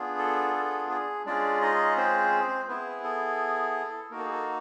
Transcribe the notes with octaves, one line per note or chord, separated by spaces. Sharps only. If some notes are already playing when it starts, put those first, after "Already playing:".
Already playing: B3 D4 F4 G#4
A4
A4
G#4
G#3 C#4 D4 F4 G#4 D5
D#4 D#5
C4 C5
B3 E4 G#4 B4
A4
A#3 D#4 F#4 A#4
A4
G#4
A4